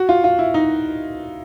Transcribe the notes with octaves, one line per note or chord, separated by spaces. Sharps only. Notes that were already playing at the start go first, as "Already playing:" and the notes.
Already playing: F#4
F4
F4
E4
D#4